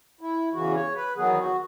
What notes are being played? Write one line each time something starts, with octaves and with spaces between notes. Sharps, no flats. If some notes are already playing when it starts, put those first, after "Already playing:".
E4
E2 C#3 E3 F#4
C#5
B4
E2 D#3 F#3 B3 G#4
F#4